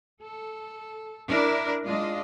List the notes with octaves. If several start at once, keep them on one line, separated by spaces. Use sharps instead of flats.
A4
D4 E4 A#4
G#3 D4 F4 D#5